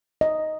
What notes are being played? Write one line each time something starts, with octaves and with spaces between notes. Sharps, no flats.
D#5